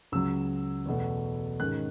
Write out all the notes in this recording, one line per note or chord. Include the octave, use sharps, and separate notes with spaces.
C#2 C#3 F#3 E6
E2 B2 A3
G#2 D#3 G#3 C#4 F#6